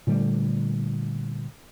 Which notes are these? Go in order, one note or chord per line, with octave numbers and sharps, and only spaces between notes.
A#2 D3 G3 A3